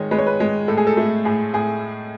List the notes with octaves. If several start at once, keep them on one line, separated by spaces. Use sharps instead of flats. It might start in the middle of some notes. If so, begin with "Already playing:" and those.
Already playing: D#3 G#3 C#5 D#5
G#3 B4
C#5
B4
G#3
A2 A4
G#4
A4
A3
A2 G#4
A2 G#4